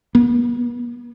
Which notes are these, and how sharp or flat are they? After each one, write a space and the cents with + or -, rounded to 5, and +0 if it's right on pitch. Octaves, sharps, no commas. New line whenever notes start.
B3 -40